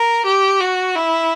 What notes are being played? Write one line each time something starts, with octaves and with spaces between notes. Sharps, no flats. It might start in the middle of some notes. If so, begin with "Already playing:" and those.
Already playing: A#4
G4
F#4
E4